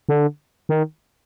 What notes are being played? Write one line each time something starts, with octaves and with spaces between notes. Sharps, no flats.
D3
D#3